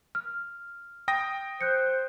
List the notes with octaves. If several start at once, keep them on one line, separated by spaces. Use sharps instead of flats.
F6
G5 D#6 A#6
C5 F#6 G6 C#7